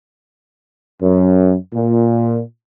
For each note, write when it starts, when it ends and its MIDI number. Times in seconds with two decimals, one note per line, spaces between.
1.02 1.55 42
1.74 2.40 46